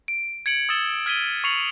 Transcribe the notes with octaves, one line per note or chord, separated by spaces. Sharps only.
D7
G#6 C#7 D7 F#7
D#6 E6 G#6 A6 E7 G7
F6 G#6 B6 D7 D#7 G7
C#6 C7 C#7 F7 F#7